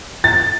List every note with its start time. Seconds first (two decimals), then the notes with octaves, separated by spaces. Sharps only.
0.24 A6